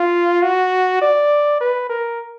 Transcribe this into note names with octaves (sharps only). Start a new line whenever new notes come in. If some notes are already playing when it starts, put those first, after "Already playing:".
Already playing: F4
F#4
D5
B4
A#4